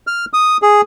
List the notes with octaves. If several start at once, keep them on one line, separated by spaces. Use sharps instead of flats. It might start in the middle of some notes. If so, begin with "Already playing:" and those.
F6
D#6
G#4